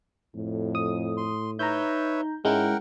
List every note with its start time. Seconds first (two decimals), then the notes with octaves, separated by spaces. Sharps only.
0.35 F2 A2
0.75 D#6
1.17 C6
1.59 D#4 B4 C#5 E5 A#5 G6
2.45 G#2 G#3 C#4 E4 A#4 F#5 G5